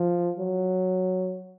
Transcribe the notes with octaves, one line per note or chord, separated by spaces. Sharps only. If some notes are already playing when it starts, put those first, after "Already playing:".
Already playing: F3
F#3